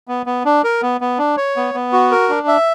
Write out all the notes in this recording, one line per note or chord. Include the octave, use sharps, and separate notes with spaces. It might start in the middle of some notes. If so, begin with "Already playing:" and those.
B3
B3
D4
A#4
B3
B3
D4
C#5
B3
B3
F#4
A#4
D4
E5